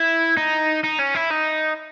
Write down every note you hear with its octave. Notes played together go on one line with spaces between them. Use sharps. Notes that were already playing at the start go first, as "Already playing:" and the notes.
Already playing: E4
D#4
D#4
C#4
E4
D#4